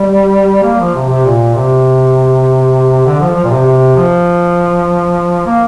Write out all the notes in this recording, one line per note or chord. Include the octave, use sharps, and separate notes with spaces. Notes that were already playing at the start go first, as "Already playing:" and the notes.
Already playing: G3
A#3
F3
C3
C3
A#2
C3
D3
F3
F3
A#2
C3
C3
F3
A#3